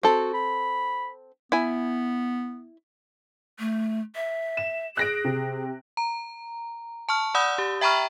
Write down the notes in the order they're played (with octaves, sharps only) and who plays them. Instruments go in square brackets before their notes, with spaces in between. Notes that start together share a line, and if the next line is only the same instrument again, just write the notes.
[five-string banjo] C4 A4 [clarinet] F#4
[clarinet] B5
[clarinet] B3 [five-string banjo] E4 G#5
[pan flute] A3
E5
[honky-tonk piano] E7
[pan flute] G#4 [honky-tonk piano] F#6 A#6 D7
[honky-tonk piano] C3
[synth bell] A#5
A5 C#6 F6
D5 F#5 B5 D#6 E6 G6
G4
E5 G5 A#5 B5 C#6 F6